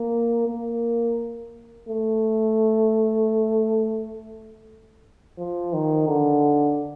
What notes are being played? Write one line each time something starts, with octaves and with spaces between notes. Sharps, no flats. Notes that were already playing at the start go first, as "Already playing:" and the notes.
Already playing: A#3
A#3
A3
F3
D#3
D3